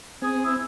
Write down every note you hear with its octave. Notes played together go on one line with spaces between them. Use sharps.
C4 G#4
E4